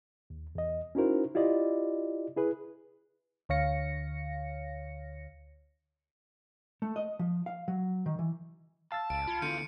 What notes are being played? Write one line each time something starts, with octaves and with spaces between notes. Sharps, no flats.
D#2
E2 D#5
C#4 D#4 E4 F#4 A#4 C5
E4 F4 G4 D5 D#5
E4 G#4 B4
D2 D3 C#5 F5 A#6 C#7
A3
D#5
F3
F5
F#3
D#3
E3
F5 A5 E6 A6
C#2 D7
F4 B5 G#6 C#7
D3 A3 B3 E4 G6 C#7 D#7